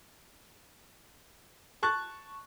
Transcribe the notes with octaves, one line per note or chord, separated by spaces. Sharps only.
A5 C#6 F#6 A6